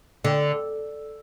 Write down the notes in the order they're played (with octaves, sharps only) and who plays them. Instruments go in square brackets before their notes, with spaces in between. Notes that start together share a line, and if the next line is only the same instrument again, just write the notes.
[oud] D3